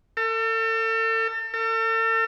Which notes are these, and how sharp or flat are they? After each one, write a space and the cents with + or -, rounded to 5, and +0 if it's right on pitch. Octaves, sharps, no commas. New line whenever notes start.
A4 +35
A4 +40